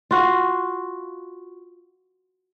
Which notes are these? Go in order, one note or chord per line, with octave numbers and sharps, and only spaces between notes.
F4 F#4 F5